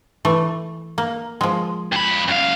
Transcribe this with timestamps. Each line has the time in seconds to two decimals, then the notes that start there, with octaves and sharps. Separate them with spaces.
0.25 E3 A3
0.98 A#3
1.41 F3 G#3
1.92 F2 B5
2.28 F#2 F5